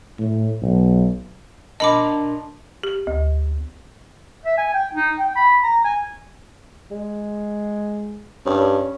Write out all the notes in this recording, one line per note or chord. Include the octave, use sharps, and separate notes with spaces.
A2
B1
D4 A#4 D#5 A5 B5 D6
G4
D2
E5
G#5
G5
D#4
G5
B5
A#5
G#5
G#3
G2 C#4